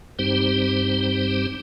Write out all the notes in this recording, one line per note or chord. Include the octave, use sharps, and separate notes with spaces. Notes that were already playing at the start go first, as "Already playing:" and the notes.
G2 G3 C4 D#4 G4 C5